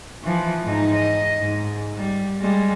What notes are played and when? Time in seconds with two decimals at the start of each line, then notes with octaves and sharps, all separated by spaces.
0.24 E3 F3
0.64 G#2 D#4
0.94 D#5
1.41 G#2
1.97 G3
2.40 G3 G#3